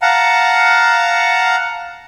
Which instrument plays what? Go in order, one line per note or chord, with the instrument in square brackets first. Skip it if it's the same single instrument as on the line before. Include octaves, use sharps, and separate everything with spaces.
[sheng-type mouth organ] F5 F#5 A5 A#5